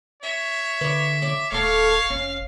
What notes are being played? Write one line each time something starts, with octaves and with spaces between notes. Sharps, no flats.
C#5 E5
D3 B4 D5
C#5 D5
D1 A3 A4 C#5 F5
F1 C#4